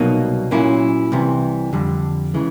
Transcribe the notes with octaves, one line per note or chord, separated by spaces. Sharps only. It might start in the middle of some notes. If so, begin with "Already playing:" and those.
Already playing: C2 B2 F#3 A#3 D#4
A#2 F#3 A#3 C#4 E4
C2 C3 E3
F2 D3 G3
C#3 E3 G#3